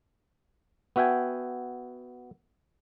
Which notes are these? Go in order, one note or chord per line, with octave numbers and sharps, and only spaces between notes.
B3 F#4 E5 G5 G#5